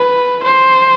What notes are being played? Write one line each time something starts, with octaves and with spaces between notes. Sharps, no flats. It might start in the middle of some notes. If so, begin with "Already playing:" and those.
Already playing: B4
C5